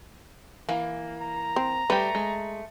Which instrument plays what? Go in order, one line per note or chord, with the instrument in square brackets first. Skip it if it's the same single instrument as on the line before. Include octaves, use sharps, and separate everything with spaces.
[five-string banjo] E3 [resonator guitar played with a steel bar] A#3
[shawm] A#5
[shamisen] C4
[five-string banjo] G3 G4 [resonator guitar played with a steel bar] A3 [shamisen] B4
[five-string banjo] G#3